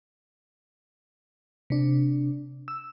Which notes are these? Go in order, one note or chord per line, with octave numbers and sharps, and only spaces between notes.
C3 D4
E6